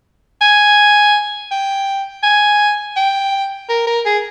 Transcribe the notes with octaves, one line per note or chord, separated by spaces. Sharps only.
G#5
G5
G#5
G5
A#4
A#4
G#4